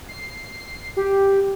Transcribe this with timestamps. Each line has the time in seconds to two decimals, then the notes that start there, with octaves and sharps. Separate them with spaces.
0.08 C7
0.97 G4